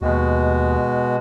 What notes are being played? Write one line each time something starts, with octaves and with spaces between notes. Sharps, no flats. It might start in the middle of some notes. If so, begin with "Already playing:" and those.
D#2 B2 G#3 F#4